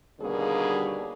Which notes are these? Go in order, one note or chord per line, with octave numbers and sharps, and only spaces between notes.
D#2 B2 D3 G3 A#3 G#4